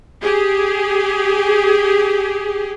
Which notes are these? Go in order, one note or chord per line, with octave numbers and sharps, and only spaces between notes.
G4 G#4